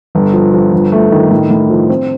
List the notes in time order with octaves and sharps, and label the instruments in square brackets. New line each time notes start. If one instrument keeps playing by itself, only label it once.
[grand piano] G1
F3
F3
G1
A3
D#3
A2
A2
F3
C4